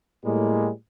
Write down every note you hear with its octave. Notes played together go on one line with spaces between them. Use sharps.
A2 G3 G#3 A#3